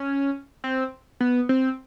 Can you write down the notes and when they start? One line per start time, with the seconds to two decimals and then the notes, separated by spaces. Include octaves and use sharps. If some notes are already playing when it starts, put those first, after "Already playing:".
Already playing: C#4
0.64 C4
1.21 B3
1.49 C4